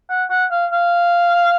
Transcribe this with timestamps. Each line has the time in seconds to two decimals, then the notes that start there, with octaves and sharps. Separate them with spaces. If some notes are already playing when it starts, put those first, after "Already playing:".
0.09 F#5
0.30 F#5
0.51 F5
0.72 F5